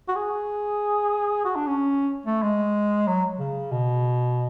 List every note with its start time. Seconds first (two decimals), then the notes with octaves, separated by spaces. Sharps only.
0.08 F#4
0.16 G#4
1.45 F#4
1.56 D4
1.67 C#4
2.26 A3
2.43 G#3
3.08 F#3
3.40 C#3
3.72 B2